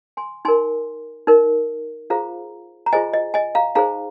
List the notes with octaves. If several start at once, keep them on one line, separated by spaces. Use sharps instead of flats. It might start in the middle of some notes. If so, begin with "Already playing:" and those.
G#5 C6
D#4 A#4 G#5 C6
D#4 A#4
F4 G#4 C5 F5 A#5
A#5
F4 G#4 C5 D#5 G#5
D#5
D#5 G#5
F5 A#5
D#4 G#4 C5 F5 A#5